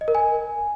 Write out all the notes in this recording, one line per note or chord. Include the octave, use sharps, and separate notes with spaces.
D#5
A#4
G#5